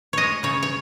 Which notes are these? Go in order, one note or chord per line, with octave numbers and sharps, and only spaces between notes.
G#3 C#5 D#5
C#3 C#5
C#5